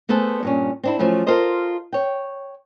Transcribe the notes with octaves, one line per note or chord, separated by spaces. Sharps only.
A3 B3 G#4 A4 C5
G2 A#2 C#4
C4 D4 E4
F3 F#3 A3 C#4 E4
F4 A4 A#4 C5 D#5
C#5 G5